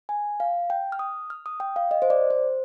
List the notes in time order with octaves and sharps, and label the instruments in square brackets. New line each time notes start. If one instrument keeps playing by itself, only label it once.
[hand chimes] G#5
F5
G5
F6
D#6
F6
D#6
G5
F5
D#5
C5
D5
C5